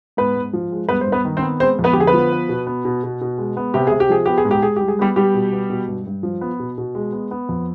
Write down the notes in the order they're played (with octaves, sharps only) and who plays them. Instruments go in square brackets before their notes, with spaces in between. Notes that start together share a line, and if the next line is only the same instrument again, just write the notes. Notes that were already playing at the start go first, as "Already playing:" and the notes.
[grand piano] G#2 B3 B4
G#2
F3
G#3
G2 B3 B4
C5
G2
B3 B4
D#3
C4 C5
B3
G#3 C4 C5
F2
B3 B4
G4
D3 G#4
B3 B4
F3
B3
B2
B3
B2
B2
B2
G#3
B3
C3 G4
C3 G#4
G4
F3 G#4
B3 G4
G#4
G#2
G4
G#2 G#4
G3 G4
G#4
G3 B3 G4
G3 B3 G4
B2
B3
B2
G2
G2
F3
B3
B2
B2
G#3
B3
B3
F2